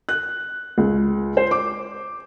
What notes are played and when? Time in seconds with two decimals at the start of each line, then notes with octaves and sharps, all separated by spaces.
0.09 F#6
0.78 C#2
1.37 C5
1.51 D6